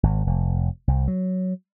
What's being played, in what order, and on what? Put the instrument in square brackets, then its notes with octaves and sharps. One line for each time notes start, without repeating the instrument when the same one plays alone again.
[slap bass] G#1
F1
C2
F#3